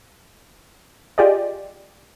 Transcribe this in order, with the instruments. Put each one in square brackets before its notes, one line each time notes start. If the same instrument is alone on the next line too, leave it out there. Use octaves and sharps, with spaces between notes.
[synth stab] F4 G4 G#4 D5 D#5